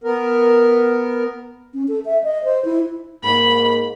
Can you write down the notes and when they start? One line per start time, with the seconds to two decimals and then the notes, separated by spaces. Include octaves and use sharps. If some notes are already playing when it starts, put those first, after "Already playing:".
0.04 B3 A#4
1.73 C#4
1.88 A4
2.06 E5
2.24 D#5
2.44 C5
2.65 E4
3.23 G#2 A#3 B5